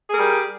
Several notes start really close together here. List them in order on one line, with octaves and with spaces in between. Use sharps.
G#4 A#4 G3